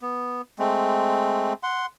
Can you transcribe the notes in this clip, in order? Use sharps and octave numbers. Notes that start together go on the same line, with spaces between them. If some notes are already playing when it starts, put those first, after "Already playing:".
B3
G#3 A3 C4
F#5 C6